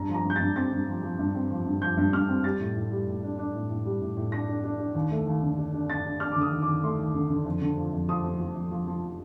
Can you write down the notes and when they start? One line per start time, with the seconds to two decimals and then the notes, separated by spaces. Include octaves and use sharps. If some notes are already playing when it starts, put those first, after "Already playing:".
Already playing: G2 A#5
0.09 F3
0.14 A#5
0.25 G2 G6
0.36 G2 A6
0.56 C4 A6
0.72 G2
0.88 F3
1.03 F3
1.19 G2
1.35 C4
1.50 F3
1.66 G2
1.82 F3 G6
1.97 G2
2.13 G2 F6
2.29 C4
2.44 G3 A6
2.60 A2
2.75 A2
2.92 G3
3.07 A2
3.23 D4
3.38 D4
3.54 A2
3.70 A2
3.85 G3
4.01 A2
4.17 A2
4.32 D4 A#6
4.48 D4
4.64 D4
4.79 D4
4.95 D#2
5.11 A3
5.27 D#2
5.43 D3
5.58 D4
5.73 D4
5.90 D4 A6
6.05 D4
6.20 D4 F6
6.32 D6
6.36 D3
6.41 D#6
6.52 D#2
6.62 D6
6.68 D#2
6.83 A3 C6
6.99 D#2
7.15 D3
7.30 D3
7.46 F2
7.62 D3
7.77 F3
7.93 F2
8.09 F3 D#6
8.24 F2
8.40 F3
8.56 F2
8.71 F3
8.87 F3